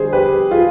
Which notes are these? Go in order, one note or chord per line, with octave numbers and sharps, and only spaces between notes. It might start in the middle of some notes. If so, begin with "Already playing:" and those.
Already playing: D3 G3 G#4 C5
G4 B4
F4 G#4